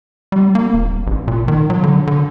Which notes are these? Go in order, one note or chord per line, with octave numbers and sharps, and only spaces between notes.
G3
A#3
D#1
A1
A#2
D#3
F#3
D3
D3